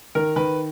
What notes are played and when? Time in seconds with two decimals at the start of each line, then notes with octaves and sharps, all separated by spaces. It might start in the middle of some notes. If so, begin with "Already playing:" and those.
0.15 D#3 A#4
0.36 D#3 B4